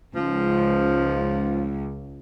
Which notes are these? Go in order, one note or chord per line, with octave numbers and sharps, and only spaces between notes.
C#2 G#2 F3